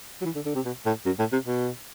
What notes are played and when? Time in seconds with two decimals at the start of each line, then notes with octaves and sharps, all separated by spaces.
0.21 F#3
0.25 E3
0.35 D3
0.46 D3
0.55 C3
0.65 B2
0.86 A2
1.06 F#2
1.19 A2
1.32 C3
1.45 B2